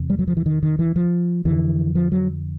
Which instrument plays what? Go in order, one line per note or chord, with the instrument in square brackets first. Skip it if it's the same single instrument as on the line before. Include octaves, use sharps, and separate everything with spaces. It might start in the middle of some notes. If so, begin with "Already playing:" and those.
Already playing: [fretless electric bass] E2 C3
G3
F#3
F3
E3
D#3
D#3
E3
F3
F2 D3 E3
F3
F#3